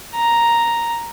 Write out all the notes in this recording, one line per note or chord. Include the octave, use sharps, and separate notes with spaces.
A#5